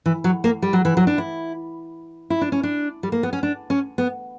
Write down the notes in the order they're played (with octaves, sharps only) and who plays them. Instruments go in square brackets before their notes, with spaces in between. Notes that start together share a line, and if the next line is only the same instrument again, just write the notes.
[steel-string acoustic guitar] E3
F#3
A#3
G3
F#3
E3
F#3
D4
E4
E4
D4
C#4
D4
G3
A#3
B3
C#4
D4
C#4
B3